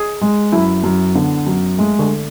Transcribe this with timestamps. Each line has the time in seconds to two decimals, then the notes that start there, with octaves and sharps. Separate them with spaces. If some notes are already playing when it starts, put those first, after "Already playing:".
Already playing: G#4
0.21 G#3
0.52 F#2 E4
0.84 F#2
1.15 D3 B3
1.47 F#2
1.78 G#3 A3
1.99 D3